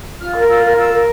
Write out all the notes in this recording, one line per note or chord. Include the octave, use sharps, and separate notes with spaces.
F4 F6
E6
A#4 F6
F4 E6
F6
A#4
F6
F4 E6
A#4